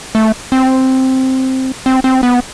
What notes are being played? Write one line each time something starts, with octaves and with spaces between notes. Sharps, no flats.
A3
C4
C4
C4
B3